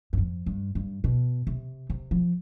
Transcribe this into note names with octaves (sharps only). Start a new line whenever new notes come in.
G2
F2
G2
G2
B2
C3
C3
F3